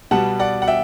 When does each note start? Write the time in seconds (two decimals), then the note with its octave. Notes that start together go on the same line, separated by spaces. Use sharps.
0.11 B2 G3 B3 F#5 A5
0.39 D5 F#5
0.62 F#5
0.68 E5 G5